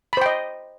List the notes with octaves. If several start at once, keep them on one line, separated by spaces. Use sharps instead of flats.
C5 D#5 G5 B5